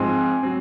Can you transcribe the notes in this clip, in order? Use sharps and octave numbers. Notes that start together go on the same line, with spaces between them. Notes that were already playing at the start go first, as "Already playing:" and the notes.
Already playing: G#2 F3 G#3 C4 G#5 C6
F#3 C4